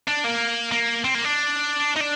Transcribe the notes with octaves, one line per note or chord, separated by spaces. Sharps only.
D4
A#3
A#3
C4
A#3
D4
D#4
D4